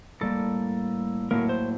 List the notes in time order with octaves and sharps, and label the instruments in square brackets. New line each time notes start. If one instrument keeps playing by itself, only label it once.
[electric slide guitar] A2 G3 A#3 A4
A2 F#3 A#3 A#4
C5